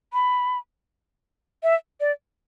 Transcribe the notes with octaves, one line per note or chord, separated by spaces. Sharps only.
B5
E5
D5